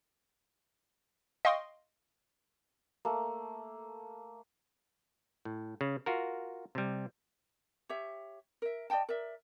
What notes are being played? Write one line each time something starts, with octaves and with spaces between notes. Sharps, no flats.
D#5 F5 G5 C6 C#6 D#6
A3 A#3
A2
C#3
F4 F#4 A#4
C3 G3
G4 C#5 E5
A#4 E5
D5 D#5 G5 A5
A#4 D5 E5